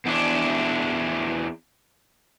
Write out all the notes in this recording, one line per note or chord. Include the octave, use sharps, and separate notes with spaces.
E2 D4